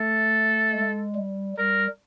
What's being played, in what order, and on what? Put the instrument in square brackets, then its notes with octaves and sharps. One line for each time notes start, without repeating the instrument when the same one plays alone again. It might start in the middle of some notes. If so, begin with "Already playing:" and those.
Already playing: [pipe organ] A3 [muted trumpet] A4
[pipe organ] G#3
G3
[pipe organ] G3 [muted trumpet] A#4